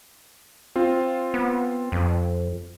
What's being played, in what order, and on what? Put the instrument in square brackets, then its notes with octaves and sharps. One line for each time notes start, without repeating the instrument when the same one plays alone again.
[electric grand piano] C4 F4
[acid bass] B3
F2